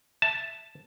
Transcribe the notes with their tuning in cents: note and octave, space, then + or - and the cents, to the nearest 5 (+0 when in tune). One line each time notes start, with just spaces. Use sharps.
E5 +0 A5 +0